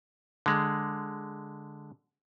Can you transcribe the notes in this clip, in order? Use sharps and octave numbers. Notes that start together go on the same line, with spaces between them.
D3 G#3